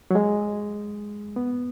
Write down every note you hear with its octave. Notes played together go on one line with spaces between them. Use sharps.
F#3
G#3
B3